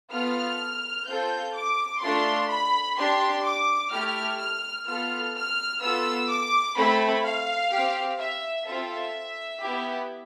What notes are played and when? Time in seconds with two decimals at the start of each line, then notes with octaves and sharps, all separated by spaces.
0.11 B3 F4 A4 F6
1.06 C4 F4 A4 G6
1.54 D6
2.01 A3 D4 F4 A4 C6
2.49 B5
2.97 D4 G4 C6
3.44 D6
3.91 A3 E4 G4 F6
4.38 F6
4.86 B3 F4 A4 F6
5.34 F6
5.81 B3 F4 A4 E6
6.29 D6
6.76 A3 C4 E4 A4 B5
7.24 F5
7.71 C4 G4
8.18 E5
8.66 C4 F4 A4 E5
9.61 B3 E4 G4